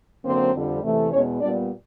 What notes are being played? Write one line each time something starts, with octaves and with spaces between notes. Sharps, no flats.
F#2 D3 F#3 A#3 C4 C5
F2 D3 G3
E2 C3 E3 A3
E2 B2 G#3 B3 C#4 C#5
A#2 G3 B3 D4 D5